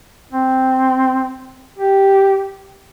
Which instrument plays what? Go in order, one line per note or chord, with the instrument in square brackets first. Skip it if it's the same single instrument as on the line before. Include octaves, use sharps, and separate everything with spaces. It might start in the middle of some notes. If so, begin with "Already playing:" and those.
[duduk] C4
G4